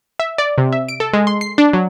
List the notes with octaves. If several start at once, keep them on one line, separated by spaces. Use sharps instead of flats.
E5
D5
C3
E5
D7
A4
G#3
C6
C7
D4
F#3